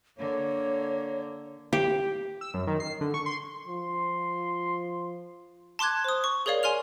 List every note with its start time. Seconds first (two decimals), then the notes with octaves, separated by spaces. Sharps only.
0.18 D3 A#3 C#5
1.73 G4
2.41 E6
2.54 F#2
2.67 D#3
2.80 C7
3.01 D3
3.14 C#6
3.26 C6
3.68 F3 C6
5.79 A5 C6 D6 F#6 G#6
6.04 C5 D#6
6.24 C#6
6.46 G#4 A#4 C#5 D5 F5
6.63 G#5 C6 F6 F7